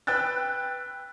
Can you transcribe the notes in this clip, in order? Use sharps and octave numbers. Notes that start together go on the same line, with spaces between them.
B4 G5 E6 F#6 A6